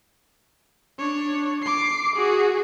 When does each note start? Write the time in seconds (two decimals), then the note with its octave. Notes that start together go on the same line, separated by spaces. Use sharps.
0.98 D4 C#5
1.62 D6 C7
2.16 F#4 G#4